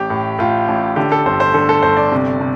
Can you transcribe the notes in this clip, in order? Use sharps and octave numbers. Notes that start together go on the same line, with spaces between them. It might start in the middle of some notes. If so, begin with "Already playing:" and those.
Already playing: A1 G4
A2
A2 F4
A1
D3 G4
A4
G1 C5
C5
D3 A4
A4
G1 C5
D5
C3
C3